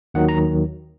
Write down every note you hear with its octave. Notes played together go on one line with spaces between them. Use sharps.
D#2 D#3 F#3 F#5
A#5